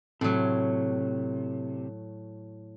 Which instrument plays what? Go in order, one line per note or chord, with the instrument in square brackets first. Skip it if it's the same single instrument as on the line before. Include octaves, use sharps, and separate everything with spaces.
[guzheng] A2 F#3 [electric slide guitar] C3